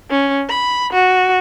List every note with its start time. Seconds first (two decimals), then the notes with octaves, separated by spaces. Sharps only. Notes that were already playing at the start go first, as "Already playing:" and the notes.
0.11 C#4
0.49 B5
0.93 F#4